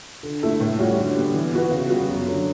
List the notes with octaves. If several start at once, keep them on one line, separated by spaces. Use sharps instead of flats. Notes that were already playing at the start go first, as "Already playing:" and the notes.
D3
A3 E4 A4
A2
G3 C#4 F#4
D3
G3 B3
E3
B3 F#4 B4
C#3
G3 B3 F#4
F#2
D3 F#3